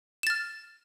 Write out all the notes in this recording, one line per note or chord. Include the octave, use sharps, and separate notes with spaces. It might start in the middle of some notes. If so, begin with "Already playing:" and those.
F6 A6 E7